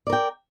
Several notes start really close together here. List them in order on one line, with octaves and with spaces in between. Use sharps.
D5 A#4 G5